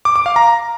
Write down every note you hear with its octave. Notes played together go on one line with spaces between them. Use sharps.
D6
D6
F5
A#5